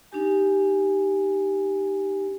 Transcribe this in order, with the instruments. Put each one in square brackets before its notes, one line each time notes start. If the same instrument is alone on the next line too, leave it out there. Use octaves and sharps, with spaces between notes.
[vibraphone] D4 D#4 G4 G#5